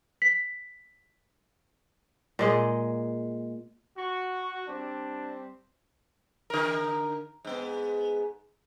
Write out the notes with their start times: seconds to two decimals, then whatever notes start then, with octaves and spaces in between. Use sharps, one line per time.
0.22 B6
2.39 A#2 G#3 D#5
3.97 F#4 C#6
4.67 G3 C4 D4
6.50 D3 A#4
7.45 G#2 B3